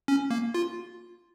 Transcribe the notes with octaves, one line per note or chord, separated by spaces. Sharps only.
C#4
A#3
F4